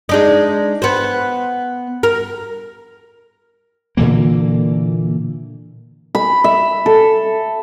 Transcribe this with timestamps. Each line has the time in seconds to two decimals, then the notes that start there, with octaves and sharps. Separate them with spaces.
0.09 G#3 D4 D#4
0.82 B3 C5
2.03 A#4
3.97 A#2 D3 E3 A#3
6.15 B5
6.44 E5
6.86 A4